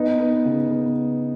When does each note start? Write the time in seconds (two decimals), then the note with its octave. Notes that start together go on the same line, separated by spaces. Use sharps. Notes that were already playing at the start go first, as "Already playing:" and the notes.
Already playing: B3 D#4
0.20 B3
0.45 C#3
0.70 B3